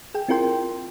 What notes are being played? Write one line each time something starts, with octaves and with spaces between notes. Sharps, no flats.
G#4 G5
C4 E4 F4 A#4 G5 C6